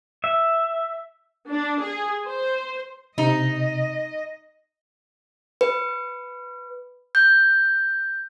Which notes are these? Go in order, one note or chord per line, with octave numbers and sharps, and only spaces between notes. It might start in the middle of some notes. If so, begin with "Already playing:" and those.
E5
D4
G#4
C5
C3 D#4 D#5
B4
G6